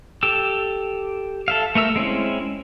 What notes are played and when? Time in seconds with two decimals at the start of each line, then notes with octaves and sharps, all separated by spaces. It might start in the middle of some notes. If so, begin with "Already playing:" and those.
0.23 G4 A4 E6
1.48 A4 E5 F5
1.75 A3 A#4 E5 E6
1.96 G#3 C4 C#4 E4